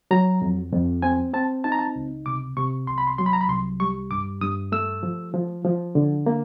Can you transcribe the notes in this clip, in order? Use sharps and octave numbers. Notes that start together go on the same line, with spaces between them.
F#3 A#5
F2
F2
C4 G#5
C4 A5
D#4 A5
A#5
A5
C#2
C3 D6
C3 C#6
C2 C6
B5
C6
F#3 C6
B5
A#5
B5
C2 C6
G3 C#6
G2 D6
G2 D#6
A3 E6
F3
F3
F3
D3
A#3